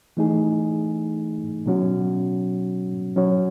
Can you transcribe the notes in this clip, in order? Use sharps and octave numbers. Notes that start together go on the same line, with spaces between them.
E3 A3 D#4 G#4
B2 F#3 C#4 F#4
F#3 C#4 F#4 C#5